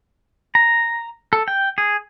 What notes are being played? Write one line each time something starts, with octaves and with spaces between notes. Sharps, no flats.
A#5
A4
G5
G#4